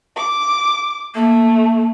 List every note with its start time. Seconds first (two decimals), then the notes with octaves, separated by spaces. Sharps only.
0.16 D6
1.15 A3 A#3